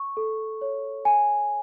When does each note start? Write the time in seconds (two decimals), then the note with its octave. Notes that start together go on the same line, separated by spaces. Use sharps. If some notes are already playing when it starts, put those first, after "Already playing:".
Already playing: C#6
0.17 A4
0.61 C#5
1.05 G#5